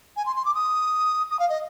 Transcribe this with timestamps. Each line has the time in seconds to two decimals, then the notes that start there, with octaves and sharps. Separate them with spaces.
0.16 G#5
0.26 C6
0.36 C6
0.45 D6
0.55 D#6
1.31 D#6
1.39 F5
1.49 D#5